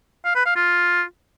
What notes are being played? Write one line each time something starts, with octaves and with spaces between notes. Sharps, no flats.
F5
B4
F5
F4